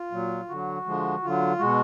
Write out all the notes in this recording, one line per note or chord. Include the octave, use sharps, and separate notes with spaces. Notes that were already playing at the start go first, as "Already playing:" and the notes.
Already playing: F4
A#2 F#3
D3 F#3 F#4
D3 F3 G#3
D3 F#3 F4
B2 G#3 F#4